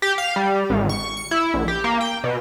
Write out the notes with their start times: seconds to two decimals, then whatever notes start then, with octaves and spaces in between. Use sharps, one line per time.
0.02 G4
0.18 F5
0.36 G3
0.70 G#1
0.89 C#6
1.17 C#7
1.31 E4
1.54 A#1
1.68 G4
1.84 A#3
2.01 G5
2.24 B2